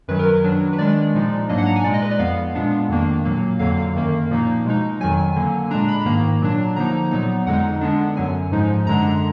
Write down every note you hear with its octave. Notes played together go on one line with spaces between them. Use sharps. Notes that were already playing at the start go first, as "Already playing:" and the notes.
F#2 D#3 F#3 B4
A#4
B4
D#3 F#3 D4
B4
D#3 G#3 D4 D5
A#2 F3 G#3 D#4
G#2 F#3 A#3 D4 D#5
F#5
A#5
G#5
A#2 G#3 D#4 D5
D#5
B4
D5
F2 F3 B3 F5
A#2 G#3 B3 D4
F2 D#3 A#3 D4
A#2 F#3 A#3
F2 D3 F#3 A#3 F5
F#2 D#3 A#3
A#2 F3 A#3 D#4
B2 G#3 D#4
F2 D#3 F#3 G#5
D3 F#3 A#3
A#2 G#3 D4 A#5
B5
G#2 D#3 A#3 A#5
A#2 F#3 D4
D3 F3 A#3 D#4 A#5
A#2 F#3 B3 D#4
F2 D3 G#3 D#4 F#5
D3 G#3 B3 D4
F#2 D3 F#3 G#5
G#2 F3 G#3 D#4
F#2 D3 G#3 D4 A#5
A#5